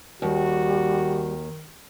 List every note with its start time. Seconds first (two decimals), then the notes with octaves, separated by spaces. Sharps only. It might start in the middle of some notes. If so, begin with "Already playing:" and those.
0.22 D#2 D#3 G3 F#4